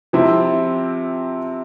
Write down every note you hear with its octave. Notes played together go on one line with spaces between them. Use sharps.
C3 F3 C4 E4